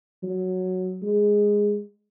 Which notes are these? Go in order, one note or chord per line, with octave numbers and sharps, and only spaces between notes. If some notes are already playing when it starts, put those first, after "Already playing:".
F#3
G#3